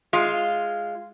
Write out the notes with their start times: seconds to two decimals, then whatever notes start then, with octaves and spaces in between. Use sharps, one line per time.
0.13 G#3 F4